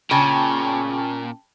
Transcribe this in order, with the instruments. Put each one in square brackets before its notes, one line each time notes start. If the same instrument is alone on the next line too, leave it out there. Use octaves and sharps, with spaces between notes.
[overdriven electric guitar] A#2 [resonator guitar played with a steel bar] C#3 [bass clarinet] C#4 [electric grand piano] G5 A5